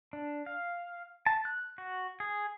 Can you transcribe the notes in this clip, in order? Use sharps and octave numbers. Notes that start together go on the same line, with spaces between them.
D4
F5
A5
F#6
F#4
G#4